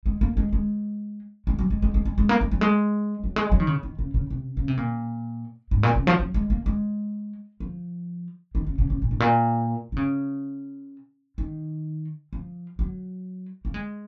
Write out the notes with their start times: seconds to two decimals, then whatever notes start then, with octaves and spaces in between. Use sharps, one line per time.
0.06 G#3
0.21 A#3
0.37 G#3
0.53 G#3
1.47 G#3
1.59 F#3
1.70 G#3
1.82 G#3
1.94 G#3
2.05 G#3
2.18 G#3
2.29 A#3
2.41 G#3
2.52 F#3
2.61 G#3
3.24 F#3
3.36 G#3
3.52 F#3
3.60 D#3
3.67 C#3
3.83 D#3
3.99 C#3
4.14 C#3
4.30 C3
4.57 C#3
4.68 C3
4.77 A#2
5.71 G#2
5.83 A#2
5.95 C#3
6.07 F3
6.19 F#3
6.34 G#3
6.50 A#3
6.66 G#3
7.60 F3
8.55 D#3
8.67 C#3
8.78 C#3
8.90 C#3
9.02 A#2
9.11 G#2
9.20 A#2
9.92 D#3
9.96 C#3
11.38 D#3
12.33 F3
12.79 F#3
13.65 A#3
13.74 G#3